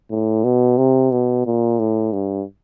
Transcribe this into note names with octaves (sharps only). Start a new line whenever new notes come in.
A2
B2
C3
B2
A#2
A2
G2